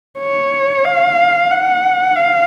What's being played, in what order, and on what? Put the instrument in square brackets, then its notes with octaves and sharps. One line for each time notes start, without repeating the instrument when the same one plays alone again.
[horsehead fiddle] C#5
F5
F#5
F5